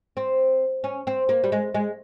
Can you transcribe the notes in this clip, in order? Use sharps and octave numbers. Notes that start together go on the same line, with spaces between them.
C4
C#4
C4
A#3
G3
G#3
G#3